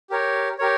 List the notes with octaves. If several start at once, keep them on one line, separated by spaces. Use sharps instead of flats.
G4 A#4 C#5
G4 A#4 C#5